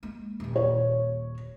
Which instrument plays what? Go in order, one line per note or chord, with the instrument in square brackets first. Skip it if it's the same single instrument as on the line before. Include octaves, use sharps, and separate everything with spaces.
[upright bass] G#3 A#3
D#1 A#3
[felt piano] C#5